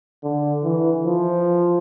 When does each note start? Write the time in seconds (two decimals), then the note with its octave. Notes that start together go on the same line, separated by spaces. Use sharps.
0.23 D3
0.64 E3
1.06 F3